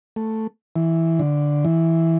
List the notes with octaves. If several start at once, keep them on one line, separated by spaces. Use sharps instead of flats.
A3
E3
D3
E3